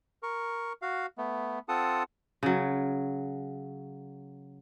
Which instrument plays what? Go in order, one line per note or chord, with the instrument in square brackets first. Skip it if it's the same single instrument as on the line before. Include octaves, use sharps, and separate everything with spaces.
[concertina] A#4 C#6
F#4 F5
A3 B3
C4 F4 A4 F#5 A5 D#6
[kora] C#3 F#3